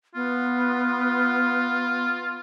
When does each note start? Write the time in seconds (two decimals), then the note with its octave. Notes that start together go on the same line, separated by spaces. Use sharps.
0.15 B3 F4